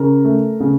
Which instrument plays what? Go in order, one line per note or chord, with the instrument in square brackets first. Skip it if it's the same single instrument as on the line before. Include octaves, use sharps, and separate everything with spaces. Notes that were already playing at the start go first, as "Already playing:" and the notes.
Already playing: [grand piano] C#3 A#4
A3
C#3